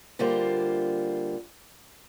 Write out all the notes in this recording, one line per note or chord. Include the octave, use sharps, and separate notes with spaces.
D3 G3 A#3 F4 C5